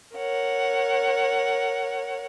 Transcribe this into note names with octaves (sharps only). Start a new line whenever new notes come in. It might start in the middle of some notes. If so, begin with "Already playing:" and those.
A#4 C#5 F#5